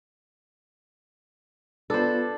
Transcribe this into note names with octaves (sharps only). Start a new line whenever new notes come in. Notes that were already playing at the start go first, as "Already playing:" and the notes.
B3 D4 F4 A4 B4 C5 B5